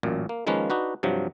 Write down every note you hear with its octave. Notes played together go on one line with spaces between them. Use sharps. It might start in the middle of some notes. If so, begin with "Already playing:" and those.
A1 F#2 A#2
A#3
D#3 F3 G#3 A#3 C#4 B4
D4 D#4 F#4 B4
G2 C3 F3 F#3